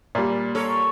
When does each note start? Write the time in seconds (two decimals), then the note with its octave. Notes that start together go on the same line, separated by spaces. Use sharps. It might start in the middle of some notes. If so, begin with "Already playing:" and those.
0.15 A#2 G3
0.55 A4 A#4 C#5